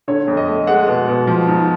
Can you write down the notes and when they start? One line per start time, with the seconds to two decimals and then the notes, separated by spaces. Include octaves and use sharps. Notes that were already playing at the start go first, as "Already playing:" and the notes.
0.08 D3 C#5
0.28 F2
0.37 D#5
0.48 A3
0.67 G#3 F#5
0.88 B2
1.07 B2
1.27 F3
1.47 G#2